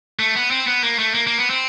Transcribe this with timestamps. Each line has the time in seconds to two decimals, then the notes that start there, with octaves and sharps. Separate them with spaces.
0.19 A3
0.35 B3
0.51 C4
0.67 B3
0.83 A#3
0.99 A3
1.14 A#3
1.27 A#3
1.39 B3
1.50 C4